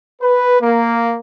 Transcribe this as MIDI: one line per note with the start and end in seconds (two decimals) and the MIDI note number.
0.22 0.61 71
0.62 1.16 58